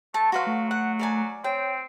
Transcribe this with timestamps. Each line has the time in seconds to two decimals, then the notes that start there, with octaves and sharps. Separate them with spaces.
0.14 A3 A5
0.32 F#3 F#4 B4 F5 C6
0.47 A3
0.71 F#5
0.99 A#4 D5 G#5
1.44 C4 C#5 G5